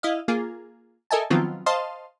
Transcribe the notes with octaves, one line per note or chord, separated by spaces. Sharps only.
E4 D#5 F5
A#3 F4 G#4
A4 A#4 D#5 E5 G#5 A5
D#3 F3 F#3 B3 C4 F4
C5 D#5 F5 A5 C6